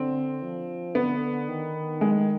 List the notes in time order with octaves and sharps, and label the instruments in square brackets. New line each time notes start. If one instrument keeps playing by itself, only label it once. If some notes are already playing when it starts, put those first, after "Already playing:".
Already playing: [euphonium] D3 [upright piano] C4
[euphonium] F3
[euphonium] D3 [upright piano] B3
[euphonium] D#3
[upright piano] G#3